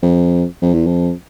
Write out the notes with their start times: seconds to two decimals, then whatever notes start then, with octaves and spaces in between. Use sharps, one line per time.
0.03 F2
0.62 F2
0.74 E2
0.87 F2